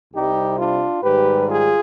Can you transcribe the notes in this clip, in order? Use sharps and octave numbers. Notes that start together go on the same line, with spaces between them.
C2 C3 G3 D#4 G4
D4 F4
G#2 D#3 G3 G4 B4
F4 G#4